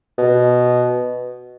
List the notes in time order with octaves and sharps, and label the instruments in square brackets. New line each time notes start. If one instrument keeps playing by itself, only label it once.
[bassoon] B2